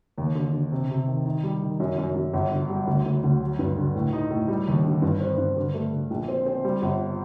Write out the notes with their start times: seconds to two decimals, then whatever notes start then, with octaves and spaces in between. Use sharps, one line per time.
0.18 D#2
0.35 D3
0.53 D3
0.72 C3
0.90 C3
1.07 D#3
1.26 D#3
1.44 G3
1.62 D#3
1.80 F#2
1.98 F#2
2.15 F#2
2.33 G1
2.51 D3
2.69 G3
2.87 D2
3.06 D2
3.24 D2
3.41 F#3
3.59 G2
3.77 D3
3.95 A2
4.13 D#4
4.31 A2
4.48 G3
4.67 D#2
4.84 D3
5.02 G2
5.20 C4
5.38 G2
5.56 D3
5.74 A3
5.93 D3
6.10 A#1
6.28 C4
6.46 C4
6.65 G3
6.82 G1